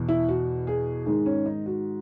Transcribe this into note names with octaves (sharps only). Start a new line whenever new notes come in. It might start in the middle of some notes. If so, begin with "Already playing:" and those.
Already playing: E2 B2
E4
F#4
G#4
G#2 D#3 G#4
C#4
D#4
F#4